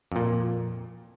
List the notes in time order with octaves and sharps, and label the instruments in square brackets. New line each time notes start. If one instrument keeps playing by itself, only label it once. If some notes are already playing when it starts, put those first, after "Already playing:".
[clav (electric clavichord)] F2 A#2